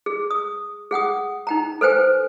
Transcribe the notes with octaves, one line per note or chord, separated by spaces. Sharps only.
G#4
D#6
G#4 F#5 G5 D#6
D#4 G5 A#5
A4 B4 C5 G5 G#5